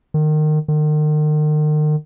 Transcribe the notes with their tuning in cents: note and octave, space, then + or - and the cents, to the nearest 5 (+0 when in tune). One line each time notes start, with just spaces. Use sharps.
D#3 -25
D#3 -40